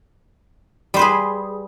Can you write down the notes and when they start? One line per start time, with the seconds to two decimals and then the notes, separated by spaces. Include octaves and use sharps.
0.94 G3
0.96 C5
0.99 B4
1.01 G#4